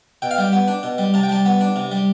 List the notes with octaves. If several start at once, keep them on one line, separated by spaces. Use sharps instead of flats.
B2 G5
F5
G3 G5
B3
D4
B2
G3
C3 A5
G5
G3 A5
B3
D4
C3
G3